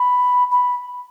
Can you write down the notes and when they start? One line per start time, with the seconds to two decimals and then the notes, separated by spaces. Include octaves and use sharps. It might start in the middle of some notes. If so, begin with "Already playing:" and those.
Already playing: B5
0.51 B5